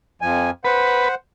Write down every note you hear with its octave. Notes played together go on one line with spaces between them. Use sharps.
F2 F3 G#5
B4 C5 F#5